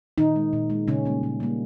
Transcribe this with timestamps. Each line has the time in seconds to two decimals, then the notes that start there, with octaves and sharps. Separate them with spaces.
0.18 A#2 D#3 D#4
0.36 G#3
0.53 A#2
0.70 G#3
0.88 A#2 C#3 C#4
1.05 G3 A#3
1.23 A#2
1.40 G3 A#3